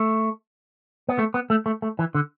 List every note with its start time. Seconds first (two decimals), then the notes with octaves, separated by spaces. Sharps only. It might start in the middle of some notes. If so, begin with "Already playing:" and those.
Already playing: A3
1.09 B3
1.19 A3
1.34 B3
1.50 A3
1.66 A3
1.82 A3
1.99 E3
2.15 D3